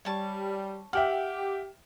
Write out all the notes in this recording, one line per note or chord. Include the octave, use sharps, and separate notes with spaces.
G3 C#5 A5 C#6
G4 E5 F#5 G5 F6